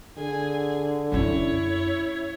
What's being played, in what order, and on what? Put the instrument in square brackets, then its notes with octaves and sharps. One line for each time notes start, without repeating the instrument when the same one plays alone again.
[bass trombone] D3 [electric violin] G#4 G#5
[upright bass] F#2 C#4 [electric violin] E4 C#5